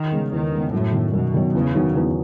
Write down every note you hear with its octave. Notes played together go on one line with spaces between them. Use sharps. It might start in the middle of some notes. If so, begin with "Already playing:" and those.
Already playing: D#3
C#3 G#3 B3
E2 D#3
C#3 G#3 B3
F#2 A2
D#3 F#3
F#2 B2
D#3 F#3
E2 C#3
D#3 F#3 B3 D#4
E2